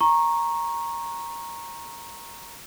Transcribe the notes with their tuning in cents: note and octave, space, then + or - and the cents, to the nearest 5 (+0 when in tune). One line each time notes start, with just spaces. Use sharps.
A#5 +0 C#6 -20